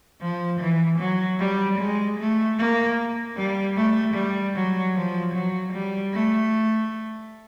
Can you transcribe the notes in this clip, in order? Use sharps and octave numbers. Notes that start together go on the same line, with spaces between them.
F3
E3
F#3
G3
G#3
A3
A#3
G3
A3
G3
F#3
F3
F#3
G3
A3